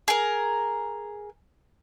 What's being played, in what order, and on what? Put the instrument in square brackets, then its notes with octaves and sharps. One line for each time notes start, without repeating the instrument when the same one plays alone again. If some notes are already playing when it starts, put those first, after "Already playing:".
[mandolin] G#4 A#4